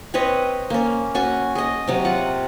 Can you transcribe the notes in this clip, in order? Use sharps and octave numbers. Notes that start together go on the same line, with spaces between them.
C4 B4 C#5 D#5
A#3 C#4
C#4 F#4 G#5
G#4 D#5
C3 F#3
F4 F#5